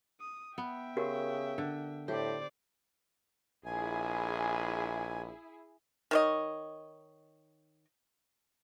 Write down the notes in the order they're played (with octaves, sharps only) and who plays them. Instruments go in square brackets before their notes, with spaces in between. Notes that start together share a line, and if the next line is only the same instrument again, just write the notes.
[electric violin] D#6
[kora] B3 [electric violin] E5 G5
[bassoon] C#3 [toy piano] F#4 G4 A#4
[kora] D3
[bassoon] A2 [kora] G4 [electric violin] C5 D5
[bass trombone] A#1 [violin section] E4 G#4 [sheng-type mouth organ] G#5
[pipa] D#3 C#5 D#5